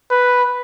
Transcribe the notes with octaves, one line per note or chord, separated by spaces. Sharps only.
B4